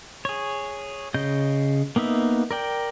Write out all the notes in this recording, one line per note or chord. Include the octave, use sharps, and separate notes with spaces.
G#4 C#5
C#3 D#5 G6
A#3 B3 D#4 E5
A#4 D5 G5